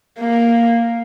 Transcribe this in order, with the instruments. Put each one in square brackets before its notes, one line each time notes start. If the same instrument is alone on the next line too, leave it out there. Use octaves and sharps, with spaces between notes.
[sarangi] A#3